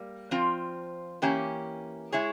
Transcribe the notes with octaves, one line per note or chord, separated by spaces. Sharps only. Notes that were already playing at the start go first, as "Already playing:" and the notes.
Already playing: G3 A#3
F3 C4 F4
E3 A#3 C#4 G4
G#3 E4 G#4 C#5